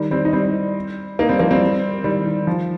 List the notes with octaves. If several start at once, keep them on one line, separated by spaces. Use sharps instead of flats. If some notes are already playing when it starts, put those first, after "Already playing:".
Already playing: D#3 G3
G3 C4
D#4
G3 C4
A#3 D#4
G3 C4
F3 A#3
G3 C4
D#3 G3
D#3
F3